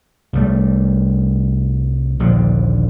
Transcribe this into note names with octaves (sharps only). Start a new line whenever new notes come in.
C2 G3 A3
A#1 D#2 D3 F3